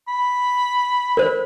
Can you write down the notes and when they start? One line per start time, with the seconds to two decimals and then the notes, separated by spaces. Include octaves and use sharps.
0.08 B5
1.17 A#4 C5